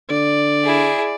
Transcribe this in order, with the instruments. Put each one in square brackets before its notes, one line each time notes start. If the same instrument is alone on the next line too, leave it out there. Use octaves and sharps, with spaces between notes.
[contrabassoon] D3 [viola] D5
[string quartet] E4 G#4